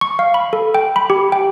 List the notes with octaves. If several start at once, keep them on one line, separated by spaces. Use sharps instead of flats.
C#6
F5
B5
A4
G5
B5
G4
G5